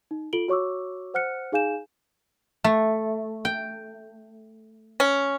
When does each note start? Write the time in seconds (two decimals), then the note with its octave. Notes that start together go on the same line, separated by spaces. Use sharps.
0.11 D#4
0.33 F4 A4 D7 F#7 G7
0.48 F#4 C#5 C#6 D6 E6
1.14 C5 F#5 F6 F#6 C#7
1.52 D#4 G#4 F5 G#5 G6 E7
2.64 A3
3.45 G5
5.00 C#4